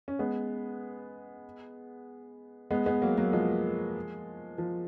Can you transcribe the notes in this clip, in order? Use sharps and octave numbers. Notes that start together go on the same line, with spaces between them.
C#4
G#3 B3
G#3 B3
G#3 B3
F#3 A#3
F#3 A#3
F3 G#3
F3